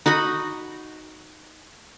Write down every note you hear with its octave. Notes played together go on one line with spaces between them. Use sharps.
D#4 F#4 D#5 B5